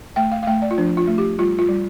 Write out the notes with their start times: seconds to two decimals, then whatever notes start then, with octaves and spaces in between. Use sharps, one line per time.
0.16 A3 G5
0.32 F5
0.43 F5
0.47 A3 G5
0.62 D5
0.71 F4
0.78 F3 D4
0.97 F4
1.08 A3
1.18 G4
1.39 G3 F4
1.58 F4
1.69 G3